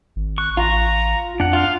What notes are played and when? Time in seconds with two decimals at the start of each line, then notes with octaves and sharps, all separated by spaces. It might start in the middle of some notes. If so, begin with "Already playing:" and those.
0.16 G#1
0.38 C#6 F#6
0.57 A1 F4 A#5
1.40 F2 D4 F#5
1.53 F4 F5